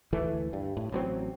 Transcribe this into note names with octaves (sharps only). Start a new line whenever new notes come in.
D2 E3 A3
G2
A2
A1 F#3 C4